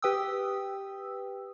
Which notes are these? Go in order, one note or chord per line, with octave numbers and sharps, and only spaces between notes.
G4 B4 G5 D#6 E6